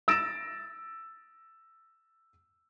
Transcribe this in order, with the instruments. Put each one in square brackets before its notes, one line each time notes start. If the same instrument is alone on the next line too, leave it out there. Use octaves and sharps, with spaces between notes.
[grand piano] E6 A6 A#6 D7 E7